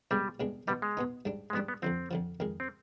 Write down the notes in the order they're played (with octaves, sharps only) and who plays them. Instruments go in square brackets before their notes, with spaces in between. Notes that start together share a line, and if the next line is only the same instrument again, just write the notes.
[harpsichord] C2 B2 G#3 D4 [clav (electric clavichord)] G3
[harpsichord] C2 B2 G#3 D4
[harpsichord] B2 B3 D#4 [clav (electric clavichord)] G3
[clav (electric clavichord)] G#3
[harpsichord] B2 B3 D#4
G#2 G3 D4
[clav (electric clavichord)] G#3
[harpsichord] G#2 G3 D4 [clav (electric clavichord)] B3
[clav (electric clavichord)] B3
[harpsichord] F2 D3 F3 [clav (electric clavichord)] C4
[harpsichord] F2 D3 F3
F2 D#3 G#3
[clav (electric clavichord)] C4